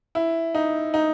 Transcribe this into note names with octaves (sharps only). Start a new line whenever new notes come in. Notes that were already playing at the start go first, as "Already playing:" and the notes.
E4
D#4
D#4